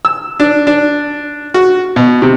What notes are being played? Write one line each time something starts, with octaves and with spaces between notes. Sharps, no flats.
E6
D4
D4
F#4
B2
C3